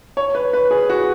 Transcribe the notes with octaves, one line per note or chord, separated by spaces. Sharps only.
C#5
B4
B4
G#4
F#4